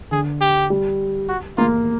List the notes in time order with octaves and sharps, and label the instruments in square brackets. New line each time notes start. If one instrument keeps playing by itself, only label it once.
[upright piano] D3 [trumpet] G#4
[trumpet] G4
[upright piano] G3
[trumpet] F#4
[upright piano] A#3 [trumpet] F4